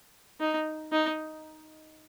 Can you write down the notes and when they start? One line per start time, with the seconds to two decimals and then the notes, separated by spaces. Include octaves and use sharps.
0.40 D#4
0.92 D#4